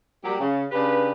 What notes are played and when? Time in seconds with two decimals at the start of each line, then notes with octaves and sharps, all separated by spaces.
0.24 F#3 G3 A#3 G4
0.38 C#3
0.72 C#3 D4 G4 B4